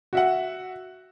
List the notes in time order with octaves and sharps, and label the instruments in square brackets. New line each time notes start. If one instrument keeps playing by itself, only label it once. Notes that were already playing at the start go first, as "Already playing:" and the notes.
[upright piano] F#4 E5 F#5